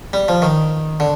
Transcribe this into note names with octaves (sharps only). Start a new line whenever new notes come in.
G3
F3
D#3
D3